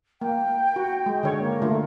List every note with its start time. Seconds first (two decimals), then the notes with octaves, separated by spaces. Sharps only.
0.21 A#3 G5
0.76 F#4
1.06 G#3
1.23 D3 C#5
1.40 A#3
1.62 D3 A3 F4